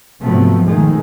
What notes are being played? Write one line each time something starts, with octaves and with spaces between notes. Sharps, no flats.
G#2 C3 F3 F#3 A3 B3
B2 D#3 F3 G#3 A3